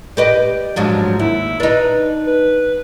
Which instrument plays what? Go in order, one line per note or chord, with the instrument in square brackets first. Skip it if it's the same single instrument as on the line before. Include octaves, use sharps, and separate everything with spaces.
[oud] G4 B4 D#5 [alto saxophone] D5
[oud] G#2 F3 D4 [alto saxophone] F#3
[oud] D#2 [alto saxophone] E4
[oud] D4 D#4 [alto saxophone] B4
[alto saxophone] B4